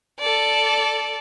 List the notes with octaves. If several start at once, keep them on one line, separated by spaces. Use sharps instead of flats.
A4 D5